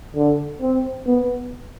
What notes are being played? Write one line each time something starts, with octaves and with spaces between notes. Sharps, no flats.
D3
C4
B3